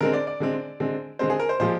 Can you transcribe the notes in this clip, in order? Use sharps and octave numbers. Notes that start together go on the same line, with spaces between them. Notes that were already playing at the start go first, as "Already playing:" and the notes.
D3 G#3 C4 A#4
D5
D5
D3 G#3 C4
D3 G#3 C4
D3 G#3 C4 C5
G#4
A#4
C5
A#2 F3 G#3 C5